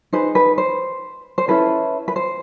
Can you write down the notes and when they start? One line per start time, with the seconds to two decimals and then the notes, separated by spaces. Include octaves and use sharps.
0.13 D#4 G#4 B4 C5
0.35 B4
0.58 C5
1.38 C5
1.48 C#4 E4 A4 B4
2.08 B4
2.16 C5